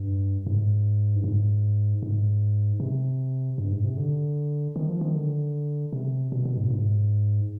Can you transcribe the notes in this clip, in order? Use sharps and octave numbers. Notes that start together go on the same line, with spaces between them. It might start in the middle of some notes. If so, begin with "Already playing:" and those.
Already playing: G2
G#2
G2
G#2
G#2
C3
G2
G#2
C3
D3
D#3
F3
D#3
D3
C3
B2
B2
G#2
B2
G#2